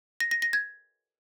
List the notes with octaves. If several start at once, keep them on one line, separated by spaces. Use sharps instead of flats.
A#6
A#6
A#6
G#6